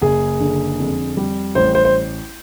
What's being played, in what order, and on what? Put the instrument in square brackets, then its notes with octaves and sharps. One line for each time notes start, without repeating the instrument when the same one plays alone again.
[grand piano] F#1 G#4
D3
F2
G3
A1 C5
C5
C5